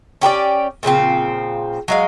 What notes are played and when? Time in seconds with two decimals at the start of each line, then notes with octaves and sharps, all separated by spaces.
0.21 C#4 G4 A#4 D5
0.83 A#2 C#3 F3 C4
1.88 F#3 G#3 F5